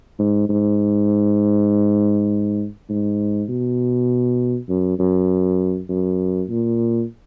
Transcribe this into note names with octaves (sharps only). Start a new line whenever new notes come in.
G#2
G#2
G#2
B2
F#2
F#2
F#2
A#2